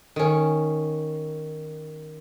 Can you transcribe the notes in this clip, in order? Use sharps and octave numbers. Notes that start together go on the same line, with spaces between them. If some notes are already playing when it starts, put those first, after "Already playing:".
D#3 C#4